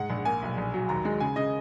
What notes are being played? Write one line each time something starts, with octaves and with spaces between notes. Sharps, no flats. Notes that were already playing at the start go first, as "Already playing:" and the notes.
Already playing: G#2 F#5
A#1
A#3 G#5
B1
A#1
F#3
D#2 A#5
G#3
C#3 G#5
C#3 D#5